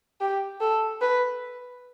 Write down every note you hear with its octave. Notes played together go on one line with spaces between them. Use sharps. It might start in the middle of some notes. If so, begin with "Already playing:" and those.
G4
A4
B4